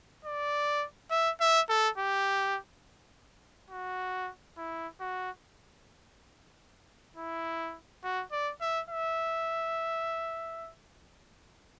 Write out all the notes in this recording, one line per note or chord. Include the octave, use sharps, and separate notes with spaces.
D5
E5
E5
A4
G4
F#4
E4
F#4
E4
F#4
D5
E5
E5